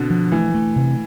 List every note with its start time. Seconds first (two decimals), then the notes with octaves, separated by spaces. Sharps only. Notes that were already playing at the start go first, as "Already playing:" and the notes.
Already playing: B2 D3 C4
0.10 F3
0.32 E3 A3
0.54 A3
0.76 C3